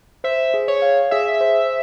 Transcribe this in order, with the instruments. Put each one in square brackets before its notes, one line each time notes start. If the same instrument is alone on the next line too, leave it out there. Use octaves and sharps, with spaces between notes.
[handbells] C5 [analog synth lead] E5
[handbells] G#4
[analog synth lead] C#5
[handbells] F5
[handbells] G#4 [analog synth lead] E5
[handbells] C5